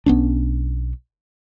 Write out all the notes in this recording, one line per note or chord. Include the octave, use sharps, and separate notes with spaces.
B1 B3 C#4 D4